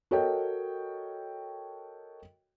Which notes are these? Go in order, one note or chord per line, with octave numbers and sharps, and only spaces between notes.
F#4 A4 A#4 C#5 D#5 G5